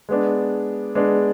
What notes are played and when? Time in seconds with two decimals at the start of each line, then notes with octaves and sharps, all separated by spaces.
0.09 G#3 B3 D4
0.95 G#3 B3 D4